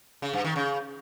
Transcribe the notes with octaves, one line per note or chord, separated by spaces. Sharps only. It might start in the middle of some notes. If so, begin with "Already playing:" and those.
C#3
G2
D#3
C#3